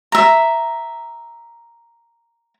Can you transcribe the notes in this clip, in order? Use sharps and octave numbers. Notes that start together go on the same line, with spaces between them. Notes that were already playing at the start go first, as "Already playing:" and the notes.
E5 A#5